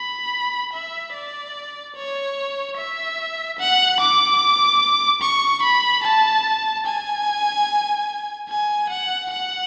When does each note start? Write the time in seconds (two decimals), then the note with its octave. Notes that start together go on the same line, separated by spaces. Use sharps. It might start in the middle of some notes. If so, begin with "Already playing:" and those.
Already playing: B5
0.73 E5
1.14 D5
1.96 C#5
2.77 E5
3.59 F#5
4.00 D6
5.22 C#6
5.63 B5
6.04 A5
6.86 G#5
8.49 G#5
8.90 F#5
9.31 F#5